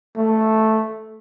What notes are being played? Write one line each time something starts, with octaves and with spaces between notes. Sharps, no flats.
A3